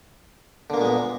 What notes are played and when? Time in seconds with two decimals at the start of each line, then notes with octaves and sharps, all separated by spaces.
0.70 D3
0.73 A#3
0.77 A#2
0.81 G#3
0.84 B3